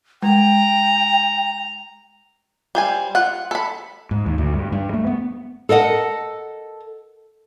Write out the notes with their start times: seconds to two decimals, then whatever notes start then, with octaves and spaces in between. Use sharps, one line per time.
0.23 G#3 G5 A#5
2.75 G3 C5 G#5
3.15 F4 F#5
3.51 A4 B5
4.11 G#2
4.26 D#2
4.38 D2
4.53 G2
4.72 G2
4.93 A3
5.07 B3
5.69 A4 A#4 D#5 F#5